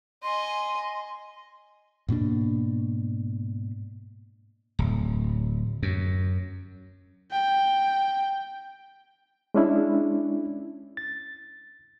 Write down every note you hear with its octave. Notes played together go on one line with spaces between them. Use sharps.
D#5 G#5 C6
G#2 B2 A#3 D4
D1
F#2
G5
G#3 C#4 D4 E4
A6